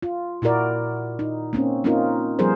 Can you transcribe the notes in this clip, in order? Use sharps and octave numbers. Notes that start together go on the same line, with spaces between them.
F4
A#2 E4 F#4 A#4 D5
D#4
A#3 C4 C#4
A#3 C4 C#4 D#4 F4 A#4
F3 G3 B3 G#4 A#4 C5